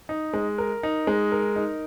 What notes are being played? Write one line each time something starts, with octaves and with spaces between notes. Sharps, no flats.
D#4
G#3
A#4
D#4
G#3
A#4
D#4